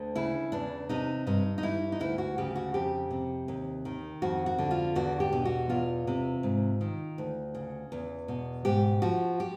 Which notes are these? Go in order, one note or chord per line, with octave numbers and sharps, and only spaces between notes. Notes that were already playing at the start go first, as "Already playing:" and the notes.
Already playing: D2 D3
C#3 E4
E2 D4
C3 D#4
G2 D#4
D#4
E3 E4
D#4
D2 E4
F#4
C#3 G4
F#4
F2 G4
C3
D#2
D#3
F2 F#4
F#4
D3
F4
E2 F#4
G4
B2
F#4
E2 F4
C3
G#2
D#3
D2
C#3
E2
B2
G#2 G4
F3 F#4
G4